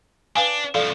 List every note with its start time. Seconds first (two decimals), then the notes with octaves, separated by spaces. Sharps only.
0.36 D4 B4 F5 G#5
0.75 C2 F3 A4 D5 F5